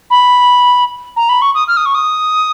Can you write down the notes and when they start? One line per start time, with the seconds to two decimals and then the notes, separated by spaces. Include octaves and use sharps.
0.10 B5
1.17 A#5
1.29 B5
1.42 C#6
1.55 D#6
1.68 F6
1.77 D#6
1.86 C#6
1.95 D#6